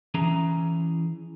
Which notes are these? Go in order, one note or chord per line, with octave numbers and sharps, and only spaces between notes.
E3 C#4 G#4 A#5